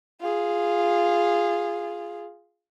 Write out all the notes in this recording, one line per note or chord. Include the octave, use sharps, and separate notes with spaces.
F4 G#4